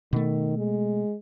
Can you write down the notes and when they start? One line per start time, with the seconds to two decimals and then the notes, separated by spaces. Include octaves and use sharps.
0.13 B2 D#3 A3
0.57 G#3